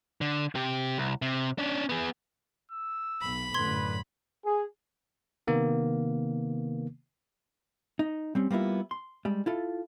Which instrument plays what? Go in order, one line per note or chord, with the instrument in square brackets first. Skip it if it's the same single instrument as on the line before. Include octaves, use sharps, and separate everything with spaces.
[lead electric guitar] D3
C3 G4
C2
C3
C#4 D4
B3 G#4
[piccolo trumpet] E6
[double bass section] B1 [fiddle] B5
[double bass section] F#2 A2 D3 [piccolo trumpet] B4 [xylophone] C6 G#6
[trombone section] G#4
[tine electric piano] C3 D#3 A#3 B3
[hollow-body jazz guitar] D#4
G3 C4 C#4
G3 A#3 B3 E4 F4
C6
G3 G#3
E4 F4 A4